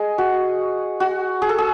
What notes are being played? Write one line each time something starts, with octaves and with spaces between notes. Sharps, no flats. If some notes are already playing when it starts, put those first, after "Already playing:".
Already playing: G#4 D#5
F#4
F#4
G#4
A4
G#4